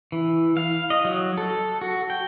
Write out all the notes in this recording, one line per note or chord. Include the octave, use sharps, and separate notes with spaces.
E3
F5
D#5
F#3
A4
F#4
G5